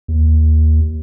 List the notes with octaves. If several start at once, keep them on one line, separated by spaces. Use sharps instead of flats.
D#2